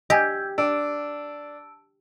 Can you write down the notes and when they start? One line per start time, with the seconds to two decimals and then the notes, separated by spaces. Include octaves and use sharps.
0.10 G4 D#5 G#5 E6 G6 G#6
0.58 D4 A5 E6 D7